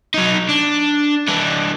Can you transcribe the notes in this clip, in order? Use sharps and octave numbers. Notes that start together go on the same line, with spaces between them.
F#3 D#4
D4
E3 D4